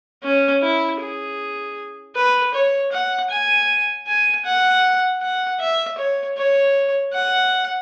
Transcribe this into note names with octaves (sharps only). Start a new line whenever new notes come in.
C#4
E4
G#4
B4
C#5
F#5
G#5
G#5
F#5
F#5
E5
C#5
C#5
F#5